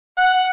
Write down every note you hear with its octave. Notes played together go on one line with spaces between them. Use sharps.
F#5